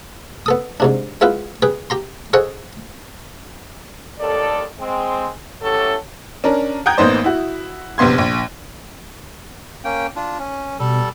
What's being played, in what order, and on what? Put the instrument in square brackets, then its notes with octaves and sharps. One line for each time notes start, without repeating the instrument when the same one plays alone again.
[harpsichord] B3 A4 D#6
G#2 C3 D4
G#3 B3 E4 F4 B4
G#4 B4 G5
G4 A#5 C6
G#4 A4 C5 C#5 D#5 F#5
[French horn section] D#2 A4 D5
G#3 C4
A2 F#3 A3 C#4 G4 A4
[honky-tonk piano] C#4 D4 A#4
F#5 G5 A#5 D#6 G6 G#6
A1 A#3 B3 D#4 C5 D5
E4 F#4
A#1 C3 B3 C6 G#6
A#1
[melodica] A#3 C#4 G5
D4 F4
C#4
[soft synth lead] B2 [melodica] G3 A4